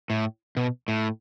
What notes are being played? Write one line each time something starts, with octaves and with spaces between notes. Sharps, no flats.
A2
B2
A2